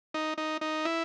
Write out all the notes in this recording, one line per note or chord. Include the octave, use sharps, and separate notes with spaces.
D#4
D#4
D#4
E4